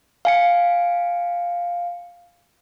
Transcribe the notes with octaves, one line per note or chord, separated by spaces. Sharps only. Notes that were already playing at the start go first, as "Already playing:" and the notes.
F5 G#5 C#7